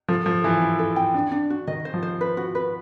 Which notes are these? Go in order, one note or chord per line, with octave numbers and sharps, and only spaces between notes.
F3 A4
F3 A4
E3 A4
E4
A4
G5
D4
D4
F#4
D#3 D#5
C5
F3
C5
B4
F#4
B4